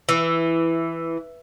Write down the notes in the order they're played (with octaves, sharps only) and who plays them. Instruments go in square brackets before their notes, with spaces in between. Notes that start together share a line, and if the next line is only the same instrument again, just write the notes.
[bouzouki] E3